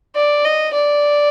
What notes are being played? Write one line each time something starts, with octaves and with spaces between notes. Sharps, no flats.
D5
D#5
D5